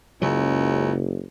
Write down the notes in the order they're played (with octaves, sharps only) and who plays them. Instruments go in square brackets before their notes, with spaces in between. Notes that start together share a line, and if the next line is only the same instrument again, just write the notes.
[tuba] F#1 [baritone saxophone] C#2 [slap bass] C#3 F#3